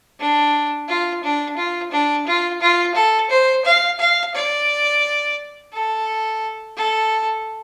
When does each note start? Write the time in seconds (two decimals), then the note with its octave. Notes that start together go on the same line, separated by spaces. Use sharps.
0.19 D4
0.88 F4
1.23 D4
1.57 F4
1.91 D4
2.27 F4
2.61 F4
2.95 A4
3.30 C5
3.65 F5
3.99 F5
4.35 D5
5.73 A4
6.77 A4